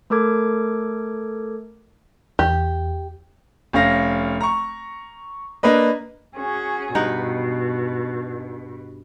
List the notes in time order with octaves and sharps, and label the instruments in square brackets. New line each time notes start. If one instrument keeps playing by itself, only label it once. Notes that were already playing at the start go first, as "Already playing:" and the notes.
[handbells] A3 A4 A#4 D6 G#6
[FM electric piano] E2 [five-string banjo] G4
[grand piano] F1 C#4 F5 A#6
A#5 C#6
A#3 D4 B4 D#5
[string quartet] C#4 F#4 G#4
[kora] G2 D#4 F#5 [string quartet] B2